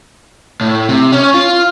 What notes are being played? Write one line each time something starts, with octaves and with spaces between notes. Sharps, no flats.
A2
C3
C#4
F4